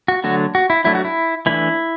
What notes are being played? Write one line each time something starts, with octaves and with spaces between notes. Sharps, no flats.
F#4
D3 F#3 A3 D4 F#4
F#4
E4
F#3 A3 D4 E4
F#4
E4
E3 A3 D4 E4